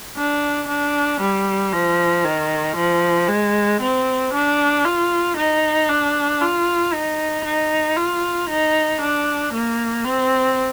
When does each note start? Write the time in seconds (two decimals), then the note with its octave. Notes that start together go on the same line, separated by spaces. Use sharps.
0.17 D4
0.68 D4
1.21 G3
1.73 F3
2.25 D#3
2.76 F3
3.29 G#3
3.81 C4
4.34 D4
4.85 F4
5.37 D#4
5.89 D4
6.41 F4
6.94 D#4
7.45 D#4
7.97 F4
8.50 D#4
9.02 D4
9.54 A#3
10.05 C4